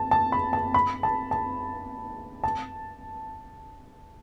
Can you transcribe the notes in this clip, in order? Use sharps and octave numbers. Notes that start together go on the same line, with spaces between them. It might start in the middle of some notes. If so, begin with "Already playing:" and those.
Already playing: A5
A5
B5
A5
B5
A5
A5
A5